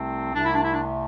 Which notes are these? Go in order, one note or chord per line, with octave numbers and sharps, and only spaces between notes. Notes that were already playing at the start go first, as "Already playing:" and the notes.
Already playing: C2 C3 A3 C4
C2 C3 A3 D4
E4
D4
E4
D4